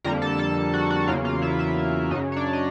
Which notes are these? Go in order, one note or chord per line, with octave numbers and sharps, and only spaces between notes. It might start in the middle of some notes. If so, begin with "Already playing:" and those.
F2 D3 G3 A#3 A#4 A#5
A4 A5
A4 A5
F#4 F#5
F#4 F#5
E2 C#3 F#3 A#3 F4 F5
F4 F5
E4 E5
E4 E5
F#2 C#3 F#3 D#4 D#5
C#5
D4 D5
D#5